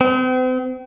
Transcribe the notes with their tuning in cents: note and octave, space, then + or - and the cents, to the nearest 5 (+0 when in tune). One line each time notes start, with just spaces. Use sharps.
C4 -40